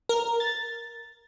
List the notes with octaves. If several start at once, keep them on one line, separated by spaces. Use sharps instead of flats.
A#4
A6